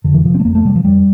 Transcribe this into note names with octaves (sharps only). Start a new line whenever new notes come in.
F2 D3
E3
C3 F3
C4
A3
F2 A#3
A3
C3 G3
F3
F2 G3